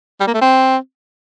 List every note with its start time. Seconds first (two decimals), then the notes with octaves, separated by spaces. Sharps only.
0.20 G3
0.27 A#3
0.34 A3
0.41 C4